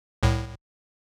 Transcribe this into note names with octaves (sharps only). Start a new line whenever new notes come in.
C2 A2